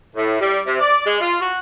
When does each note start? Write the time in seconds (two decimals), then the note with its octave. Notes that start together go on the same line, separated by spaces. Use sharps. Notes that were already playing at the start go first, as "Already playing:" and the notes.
0.16 A2
0.40 G3
0.67 C3
0.81 D5
1.06 G#3
1.21 F4
1.40 F#4